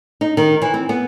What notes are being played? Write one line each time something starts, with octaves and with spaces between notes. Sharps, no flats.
D#4
D#3
E3
C4
B3